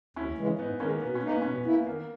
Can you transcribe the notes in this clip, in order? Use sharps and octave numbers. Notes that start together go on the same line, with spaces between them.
D#2 C#4 E4
C#3 E3 G#3
G#2 B3 D#4
D#3 G#3 A#3 C#4
B2 B3
C#4
A#3 D#4
B3
B2 C#4
B3
A#3 E4
D#3 A#3